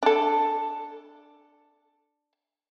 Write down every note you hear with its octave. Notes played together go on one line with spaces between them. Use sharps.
D4 A4